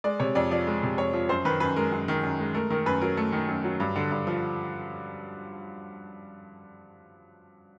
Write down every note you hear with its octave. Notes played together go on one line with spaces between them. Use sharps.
G#3 D5
C3 C#5
F2 D5
F3 D5
G#3
C3
F2 C#5
F3
F#2 C5
D#3 B4
F#2 B4
G#3 A#4
F#2
D#3
F#2
G#3
A3 A#4
D#3 A#4
F#2 B4
F#3 A#4
A3
D#3
F#2
F#3
G2
D3
G2
F3